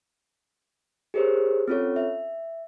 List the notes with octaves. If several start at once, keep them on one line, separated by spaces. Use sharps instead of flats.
G4 G#4 A#4 C5 C#5
C4 C#4 F4 A4 C#5
E5